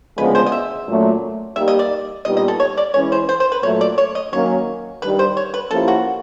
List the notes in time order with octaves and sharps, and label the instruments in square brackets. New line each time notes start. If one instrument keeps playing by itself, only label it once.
[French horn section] D2 C#3 F3 G#3 B3 [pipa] B4
[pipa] C5
D#5
E5
[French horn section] A#2 F#3 A3 C#4
[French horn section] G3 A#3 D#4 G4 [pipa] E5
[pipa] D#5
D5
[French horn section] A#2 G3 B3 D#4 G4 [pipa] D#5
[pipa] D#5
A4
C#5
D5
[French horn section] E3 G#3 C#4 [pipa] C#5
[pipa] C5
C5
C5
B4
[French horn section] A#2 F#3 A3 [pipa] C#5
[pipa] D5
C#5
D#5
[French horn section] D#3 F#3 A#3 C#4 [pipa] C#5
[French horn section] G2 D#3 G3 [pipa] B4
[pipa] C5
C#5
B4
[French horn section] F3 A#3 C#4 E4 G4 [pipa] A4
[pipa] F#4